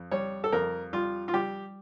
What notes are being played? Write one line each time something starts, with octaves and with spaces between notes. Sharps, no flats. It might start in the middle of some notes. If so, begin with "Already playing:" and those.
Already playing: F2
G3 C#5
A4
F2 A#4
G3 F4
F4
G3 G4